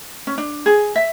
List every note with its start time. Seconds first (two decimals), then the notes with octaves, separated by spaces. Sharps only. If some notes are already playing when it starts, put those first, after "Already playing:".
0.27 C#4
0.38 D4
0.66 G#4
0.96 E5